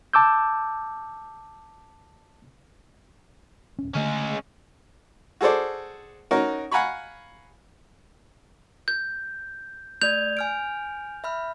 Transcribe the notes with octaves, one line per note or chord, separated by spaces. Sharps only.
A5 D6 E6 G6
D1 C#4
D3 G#3 A3 C#4
F#4 G#4 A4 C5 D5
C#4 D#4 F#4 A#4
F5 F#5 G#5 A#5 B5 C#6
G6
A3 D5 G6 G#6 F7
G#5 F6 D7
E5 B5 F6